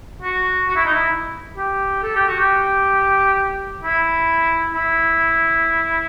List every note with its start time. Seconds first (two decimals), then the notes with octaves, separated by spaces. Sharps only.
0.22 F#4
0.68 F#4
0.76 E4
0.85 D#4
0.94 E4
1.57 G4
2.03 A4
2.16 G4
2.28 F#4
2.40 G4
3.83 E4
4.74 E4